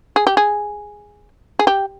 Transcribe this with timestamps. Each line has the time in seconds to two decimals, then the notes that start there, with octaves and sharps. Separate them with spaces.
0.16 G#4
0.27 G4
0.37 G#4
1.59 G#4
1.67 G4